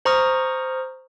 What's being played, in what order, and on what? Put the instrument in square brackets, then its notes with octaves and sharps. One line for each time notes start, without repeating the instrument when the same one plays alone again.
[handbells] C5 A#5 C#6 D#6 F6